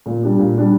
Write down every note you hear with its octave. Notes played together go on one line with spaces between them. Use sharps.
A#2
G3 D4 G4
A#2
G3 D4 G4